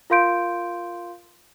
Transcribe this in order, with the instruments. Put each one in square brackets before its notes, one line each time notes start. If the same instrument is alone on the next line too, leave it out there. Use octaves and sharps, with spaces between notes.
[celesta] F4 A#4 F5 C6 G6 D7